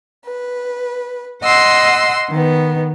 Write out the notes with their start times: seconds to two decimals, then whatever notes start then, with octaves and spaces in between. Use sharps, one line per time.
0.26 B4
1.44 D#5 F#5 C6 E6
2.30 D#3 B3